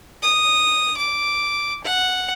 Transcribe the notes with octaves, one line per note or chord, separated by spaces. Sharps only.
D#6
D6
F#5